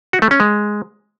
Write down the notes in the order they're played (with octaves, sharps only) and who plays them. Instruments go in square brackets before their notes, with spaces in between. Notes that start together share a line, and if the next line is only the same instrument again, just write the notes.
[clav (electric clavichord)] F#4
A3
C#4
G#3